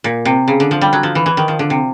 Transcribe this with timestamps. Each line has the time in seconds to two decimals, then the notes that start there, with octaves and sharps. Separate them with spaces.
0.04 A#2
0.25 C3
0.48 C#3
0.60 D3
0.71 F3
0.81 G3
0.93 F#3
1.03 F3
1.15 E3
1.26 E3
1.37 D#3
1.48 F3
1.59 D3
1.70 C3